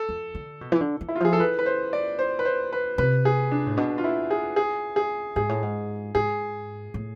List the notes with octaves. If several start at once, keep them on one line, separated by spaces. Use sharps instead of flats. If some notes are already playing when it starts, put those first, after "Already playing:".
Already playing: A4
F2
D3
B2
E3
D3
E3
E4
F4
F3 G#4
A4
E3 B4
B4
C5
D5
C5
B4
C5
B4
C3 B4
G#4
D4
A2
B2 D4
F4
E4
G#4
G#4
G#4
G#2 G#4
A2
G#2
G#2 G#4
A2